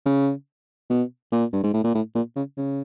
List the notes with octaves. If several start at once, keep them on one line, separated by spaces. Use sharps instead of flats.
C#3
B2
A#2
G2
G#2
A2
A#2
A2
A#2
C#3
C#3